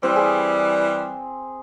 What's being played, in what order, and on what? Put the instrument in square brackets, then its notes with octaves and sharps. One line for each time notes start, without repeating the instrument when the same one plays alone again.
[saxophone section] E3 G3 [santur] C4
[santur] G#4